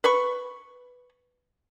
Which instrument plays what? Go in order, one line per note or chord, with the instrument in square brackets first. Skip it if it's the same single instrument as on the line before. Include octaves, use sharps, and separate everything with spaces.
[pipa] B4 B5 C#6